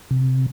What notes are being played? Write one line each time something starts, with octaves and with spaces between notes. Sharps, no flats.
C3